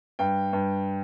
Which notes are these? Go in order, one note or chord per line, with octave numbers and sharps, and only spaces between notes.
G2 G5
G2